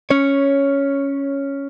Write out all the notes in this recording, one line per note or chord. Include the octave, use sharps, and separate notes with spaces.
C#4 C#5